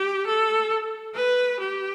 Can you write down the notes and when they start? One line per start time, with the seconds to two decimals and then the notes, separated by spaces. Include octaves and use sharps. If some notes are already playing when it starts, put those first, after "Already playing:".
Already playing: G4
0.26 A4
1.15 B4
1.60 G4